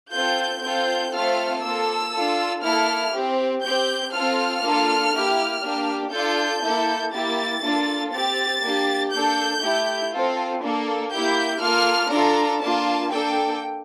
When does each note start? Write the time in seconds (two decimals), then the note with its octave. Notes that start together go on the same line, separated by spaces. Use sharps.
0.13 C4 F4 A4 G6
0.63 C4 F4 A4 G6
1.12 A3 C4 F4 A4 F6
1.63 A#3 F4 A4 E6
2.13 D4 F4 A4
2.63 A#3 E4 A4 F6
3.13 C4 G4
3.62 C4 G4 G6
4.12 C4 F4 A4 F6
4.62 A#3 D4 F4 A4
5.12 A#3 E4 G4
5.62 A#3 D4 G4
6.12 D4 F4 A4 G6
6.62 A#3 E4 A4
7.12 A#3 E4 G4 A6
7.62 A#3 D4 F4 A4
8.11 C4 G4 A6
8.61 A#3 D4 G4
9.11 A#3 D4 A4 G6
9.62 A3 E4 G4
10.11 C4 F4 A4
10.61 A#3 D4 A4
11.11 A#3 E4 G4 G6
11.61 A#3 F4 A4 F6
12.11 D4 F4 A4 A#5
12.61 A#3 D4 F4 A5
13.11 A#3 D4 A4 G5